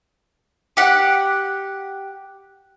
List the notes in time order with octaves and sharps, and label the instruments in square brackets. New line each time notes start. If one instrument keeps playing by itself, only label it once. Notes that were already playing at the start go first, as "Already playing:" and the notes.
[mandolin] G4 F#5